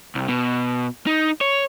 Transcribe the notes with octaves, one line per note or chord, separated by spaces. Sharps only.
C2
B2
D#4
C#5